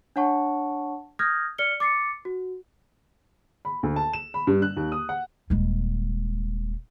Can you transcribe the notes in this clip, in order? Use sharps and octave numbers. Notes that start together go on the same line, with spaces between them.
D4 C#5 F#5 A5 C#6
D#6 F6 G6 G#6 A#6
D5 F6 C#7 G7
D6 A6 C7 C#7
F#4
B5
D2
A5
E7
B5
G2
F#6
D#2
D#6
F#5
D#1 G#3